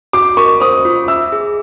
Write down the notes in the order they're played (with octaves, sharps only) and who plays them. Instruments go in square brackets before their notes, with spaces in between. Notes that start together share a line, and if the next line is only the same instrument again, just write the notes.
[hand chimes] F#4 [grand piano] D6
[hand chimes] A#4 [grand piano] C#6
[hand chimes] C5 [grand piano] D#6
[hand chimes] F4
[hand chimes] E5 [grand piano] E6
[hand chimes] G#4